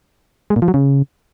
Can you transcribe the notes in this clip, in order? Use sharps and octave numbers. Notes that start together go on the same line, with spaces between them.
G#3
A#2
F3
F#3
C#3